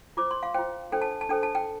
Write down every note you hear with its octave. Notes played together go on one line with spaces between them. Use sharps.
F4 C5 D6
C6
F5
F4 C5 G5
D4 A4 C5 G5
A5
A5
D4 A4 C5 G5
A5
G5